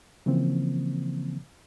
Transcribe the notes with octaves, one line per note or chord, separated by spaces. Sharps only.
C#3 E3 F3 A#3 C4